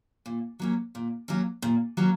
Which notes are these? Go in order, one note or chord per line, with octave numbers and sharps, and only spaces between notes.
A#2
F#3 A#3 C#4
A#2
F#3 A#3 C#4
A#2
F#3 A#3 C#4